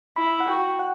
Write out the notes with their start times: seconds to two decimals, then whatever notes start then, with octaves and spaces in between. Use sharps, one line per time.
0.16 E4 B5
0.40 F#5
0.48 F#4 G5
0.79 F#5